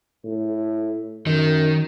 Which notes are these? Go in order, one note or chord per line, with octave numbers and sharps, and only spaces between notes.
A2
F#2 D#3